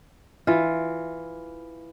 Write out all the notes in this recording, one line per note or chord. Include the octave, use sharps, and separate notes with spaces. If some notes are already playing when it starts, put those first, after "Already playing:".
E3 F4